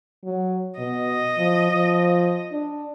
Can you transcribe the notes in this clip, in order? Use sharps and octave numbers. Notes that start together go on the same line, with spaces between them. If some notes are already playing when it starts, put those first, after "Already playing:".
F#3
B2 D#5
F3
F3
D4